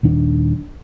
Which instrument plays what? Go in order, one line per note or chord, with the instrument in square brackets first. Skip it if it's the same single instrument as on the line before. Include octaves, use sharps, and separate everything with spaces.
[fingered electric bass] D#1 D#3 D4